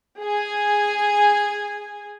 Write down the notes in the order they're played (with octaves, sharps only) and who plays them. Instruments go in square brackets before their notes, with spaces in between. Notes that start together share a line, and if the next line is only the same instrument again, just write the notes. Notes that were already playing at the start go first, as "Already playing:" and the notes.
[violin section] G#4 G#5